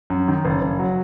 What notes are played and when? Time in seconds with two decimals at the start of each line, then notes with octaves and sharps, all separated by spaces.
0.10 F#2
0.28 D#3
0.45 F#1
0.61 F#1
0.79 F#3